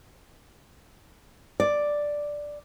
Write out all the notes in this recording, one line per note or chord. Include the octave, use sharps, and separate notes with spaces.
D5